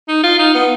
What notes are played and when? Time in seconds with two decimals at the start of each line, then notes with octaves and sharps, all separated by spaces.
0.09 D#4
0.24 F4
0.39 D#4
0.55 B3